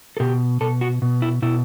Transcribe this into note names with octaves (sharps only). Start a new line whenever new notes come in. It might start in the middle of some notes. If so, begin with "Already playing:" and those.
A4
B2 G4
B2 A4
F#4
B2
E4
B2 E4